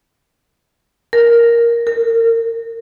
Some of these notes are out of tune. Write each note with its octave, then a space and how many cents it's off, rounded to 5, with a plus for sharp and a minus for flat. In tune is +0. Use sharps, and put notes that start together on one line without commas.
A#4 +5
A#4 -30